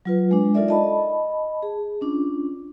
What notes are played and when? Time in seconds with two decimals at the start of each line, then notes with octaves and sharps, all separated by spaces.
0.05 F#3 F4 B4
0.31 G#3 D4
0.54 D#4 F4 A4 A#4 D5 E5
0.68 D#5 A5 B5
1.63 G#4
2.01 C#4 D4 F4